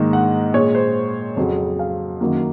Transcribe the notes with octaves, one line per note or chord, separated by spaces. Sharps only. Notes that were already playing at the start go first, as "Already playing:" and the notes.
Already playing: G#2 D#3 A#3
F#5
A#2 G#3 C#5
C5
F2 C#3 F#3
F5
F#2 D#3 F#3 A#3